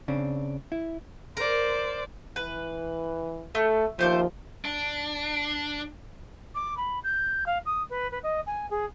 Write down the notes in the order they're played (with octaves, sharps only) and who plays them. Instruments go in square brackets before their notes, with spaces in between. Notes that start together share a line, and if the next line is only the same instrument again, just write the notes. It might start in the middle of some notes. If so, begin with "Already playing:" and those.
[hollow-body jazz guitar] C#3 C4 D4
E4
[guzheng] A#4 [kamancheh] C5 D5
[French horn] E3 [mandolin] B4
[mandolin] A3 [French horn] A4
[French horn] D#2 [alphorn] F3 [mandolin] A3 C5 D6
[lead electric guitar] D4
[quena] D6
B5
G6
F5
D#6
B4
B4
D#5
G#5
G#4